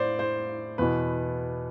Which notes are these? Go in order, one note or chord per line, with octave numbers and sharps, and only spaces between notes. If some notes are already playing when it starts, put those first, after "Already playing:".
Already playing: A2 C5 D5
C5
E2 B2 B4